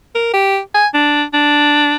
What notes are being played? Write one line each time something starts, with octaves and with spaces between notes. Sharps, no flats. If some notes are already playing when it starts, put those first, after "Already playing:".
A#4
G4
G#5
D4
D4